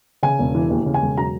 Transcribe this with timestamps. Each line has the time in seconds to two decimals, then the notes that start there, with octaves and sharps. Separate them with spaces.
0.23 C#3 G#5
0.39 E1
0.55 E3
0.70 D#2
0.86 C#3
0.94 G#5
1.02 E1
1.17 F#3 A#5